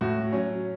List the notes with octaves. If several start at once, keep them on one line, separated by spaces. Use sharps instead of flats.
A2 F#4
F#3 C#4